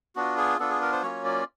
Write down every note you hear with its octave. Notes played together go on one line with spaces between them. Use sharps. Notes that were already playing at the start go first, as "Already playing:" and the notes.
B3 D4 F4 F#4
G#4
B3 D4 F4 A4
G#4
A#4
C5
F#3 A#3 C#4 F4 C#5
D5